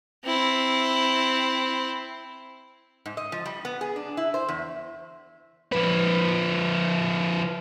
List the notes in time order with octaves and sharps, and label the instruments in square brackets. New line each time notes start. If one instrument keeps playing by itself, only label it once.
[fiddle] C4 E4
[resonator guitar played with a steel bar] G#2
D#5
F3
G3
B3
G#4
D4
E4
C5
E2
[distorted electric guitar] F3 B4